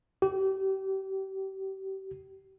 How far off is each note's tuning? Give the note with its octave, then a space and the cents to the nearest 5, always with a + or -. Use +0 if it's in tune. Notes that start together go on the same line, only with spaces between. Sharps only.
G4 -30